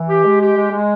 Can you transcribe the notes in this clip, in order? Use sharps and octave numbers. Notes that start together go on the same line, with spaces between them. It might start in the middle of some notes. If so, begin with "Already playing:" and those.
Already playing: E3
G4
G#3
G4
G#3
G#3